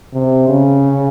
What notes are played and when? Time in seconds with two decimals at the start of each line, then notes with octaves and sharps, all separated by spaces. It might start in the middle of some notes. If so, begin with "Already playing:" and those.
0.13 C3
0.48 C#3